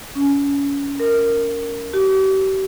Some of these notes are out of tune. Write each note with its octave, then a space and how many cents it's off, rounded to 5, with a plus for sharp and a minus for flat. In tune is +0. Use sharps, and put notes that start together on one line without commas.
C#4 +25
A#4 -10
G4 -40